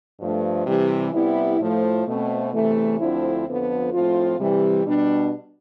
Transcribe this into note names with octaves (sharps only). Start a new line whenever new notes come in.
G2 F3 A3
C3 E3 G3
C3 G3 B3 E4
A2 F3 A3
B2 A3 C4
E2 C3 E3 A3
D2 D3 F3 C4 E4
F2 D3 F3 B3
A2 F3 C4 F4
C3 E3 G3
B2 G3 D4